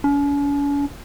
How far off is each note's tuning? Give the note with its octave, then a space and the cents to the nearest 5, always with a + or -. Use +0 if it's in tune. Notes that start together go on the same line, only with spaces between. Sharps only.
C#4 +45